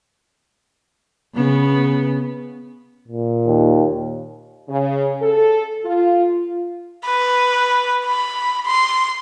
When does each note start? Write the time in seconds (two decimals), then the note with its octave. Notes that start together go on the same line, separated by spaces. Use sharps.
1.34 C#3 B3
3.08 A#2
3.47 D#2
4.69 C#3
5.22 A4
5.85 F4
7.05 B4
8.06 B5
8.66 C6